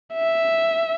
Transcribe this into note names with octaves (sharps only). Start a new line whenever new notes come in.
E5